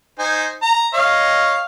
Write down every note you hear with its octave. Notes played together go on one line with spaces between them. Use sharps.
D#4 C5 G#5
A#5
C#5 D#5 F5